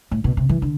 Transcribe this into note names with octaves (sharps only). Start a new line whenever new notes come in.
A2
B2
C3
E3
D3